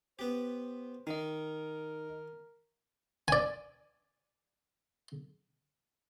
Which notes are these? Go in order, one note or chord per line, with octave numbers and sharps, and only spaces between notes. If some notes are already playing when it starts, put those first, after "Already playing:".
B3 G4 C5
D#3 D#4 A#4 D#5
D5 G#5